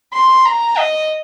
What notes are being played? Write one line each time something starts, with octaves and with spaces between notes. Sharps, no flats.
C6
A#5
D#5